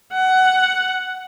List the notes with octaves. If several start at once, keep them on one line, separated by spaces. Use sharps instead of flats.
F#5